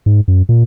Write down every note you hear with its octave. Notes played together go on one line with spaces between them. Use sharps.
G#2
F#2
A#2